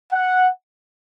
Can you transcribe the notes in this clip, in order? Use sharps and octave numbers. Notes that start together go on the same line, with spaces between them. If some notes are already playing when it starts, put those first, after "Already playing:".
F#5